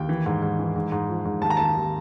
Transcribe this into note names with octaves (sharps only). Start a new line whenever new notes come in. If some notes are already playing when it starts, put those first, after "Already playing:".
Already playing: D#2 G5
E3
G#2
G#2
E3
G#2
G#2
F3
G#2
D#2 A5
A#5
D#2 A5
D#2